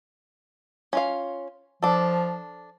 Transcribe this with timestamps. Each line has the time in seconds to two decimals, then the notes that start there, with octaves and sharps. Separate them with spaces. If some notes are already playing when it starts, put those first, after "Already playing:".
0.93 C#4 F4 F5
1.82 F3 D4 A4